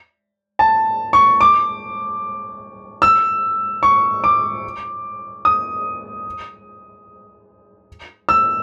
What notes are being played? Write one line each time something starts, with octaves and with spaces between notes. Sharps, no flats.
A5
C#6
D6
E6
C#6
D6
D#6
E6